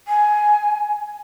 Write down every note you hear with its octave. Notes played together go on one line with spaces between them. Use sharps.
G#5